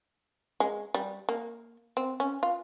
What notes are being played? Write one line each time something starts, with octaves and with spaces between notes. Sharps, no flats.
G#3
G3
A#3
C4
C#4
F4